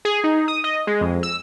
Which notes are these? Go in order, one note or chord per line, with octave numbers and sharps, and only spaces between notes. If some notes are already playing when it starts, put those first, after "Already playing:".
G#4
D#4
D#6
D#5
G#3
F2
E6